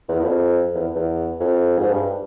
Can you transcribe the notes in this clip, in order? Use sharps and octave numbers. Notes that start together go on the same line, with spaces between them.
E2
E2
F2
E2
E2
F2
G#2
G2